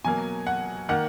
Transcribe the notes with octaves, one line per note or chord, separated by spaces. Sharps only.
B2 F#3 A#3 G#5
F#5
D#3 A#3 F#5